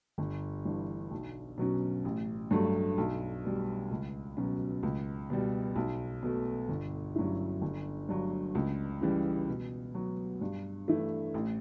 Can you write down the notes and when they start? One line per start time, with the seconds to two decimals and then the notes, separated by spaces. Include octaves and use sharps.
0.18 G1
0.65 G2 E3
1.11 B1
1.58 B2 F#3 C#4
2.05 A1
2.51 G2 F#3 A3
2.98 B1
3.44 B2 G3
3.91 C#2
4.37 B2 F#3 C#4
4.83 C#2
5.30 B2 G3
5.76 B1
6.23 B2 A3
6.69 G1
7.16 G2 F#3 C#4 E4
7.61 G1
8.09 G2 F#3
8.55 C#2
9.01 C#3 E3 G3
9.48 B2
9.95 F#3 B3
10.41 G2
10.88 E3 A3 E4
11.34 A1